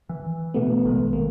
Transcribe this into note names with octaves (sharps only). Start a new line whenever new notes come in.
E3
B2 A3 B3
A#1 D#3 G#3
A#3